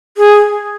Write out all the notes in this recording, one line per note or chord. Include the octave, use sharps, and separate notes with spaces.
G#4